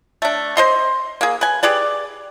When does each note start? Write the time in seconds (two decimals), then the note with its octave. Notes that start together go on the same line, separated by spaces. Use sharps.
0.22 A3 D4
0.57 C5 D#5 C6
1.21 A#3 G#4
1.41 B4 G#5
1.63 G4 G#4 B4 D5